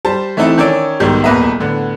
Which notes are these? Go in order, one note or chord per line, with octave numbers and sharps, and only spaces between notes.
G3 C5 A5
E3 A3 C4 D#4 E4 A4
D#3 C#4 D5 E6 D7
B1 G#2 B2 D#3 G3
D#1 E2 A#3 B4 D#5 E5
A2 D3 B3